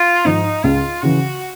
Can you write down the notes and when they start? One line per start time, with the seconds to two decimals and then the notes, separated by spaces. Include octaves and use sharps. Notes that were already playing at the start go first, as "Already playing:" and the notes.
Already playing: F4
0.25 G#2 F3 D#4
0.63 C#2 F4
1.02 C#3 E3 F#4